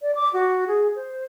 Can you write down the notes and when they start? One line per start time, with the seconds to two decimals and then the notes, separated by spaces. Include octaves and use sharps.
0.02 D5
0.15 D6
0.33 F#4
0.67 G#4
0.96 C5